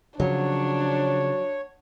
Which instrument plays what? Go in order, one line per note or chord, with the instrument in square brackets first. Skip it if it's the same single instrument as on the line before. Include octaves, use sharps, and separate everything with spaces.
[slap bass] C#3 F3 [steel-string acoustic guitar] F#3 [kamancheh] D4 [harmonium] C#5